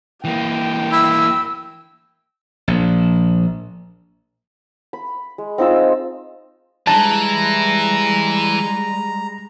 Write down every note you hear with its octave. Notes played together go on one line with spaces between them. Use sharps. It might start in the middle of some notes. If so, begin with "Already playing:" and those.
E3 A#3 G5
E4 E6
A#1
B5
G#3
C4 D#4 F4 E6
E3 G3 G#3 A5 A#5